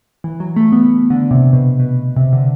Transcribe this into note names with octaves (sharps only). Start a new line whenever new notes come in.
E3
F#3
A3
B3
D3
C3
B2
B2
C3
D3